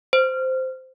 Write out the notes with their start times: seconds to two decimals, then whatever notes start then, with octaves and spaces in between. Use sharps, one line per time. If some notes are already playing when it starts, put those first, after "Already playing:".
0.13 C5